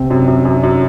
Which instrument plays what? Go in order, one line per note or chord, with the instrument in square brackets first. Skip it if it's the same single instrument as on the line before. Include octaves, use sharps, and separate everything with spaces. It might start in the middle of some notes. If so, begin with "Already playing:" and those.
Already playing: [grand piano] C3 C4
[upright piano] F#2
F#2
F#2
F#2